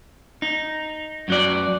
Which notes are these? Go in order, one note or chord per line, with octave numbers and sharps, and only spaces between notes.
D#4
F#2 F#3 D5